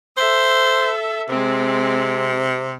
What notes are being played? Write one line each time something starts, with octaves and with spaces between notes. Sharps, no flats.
A4 C5 E5
C3 G#3 C4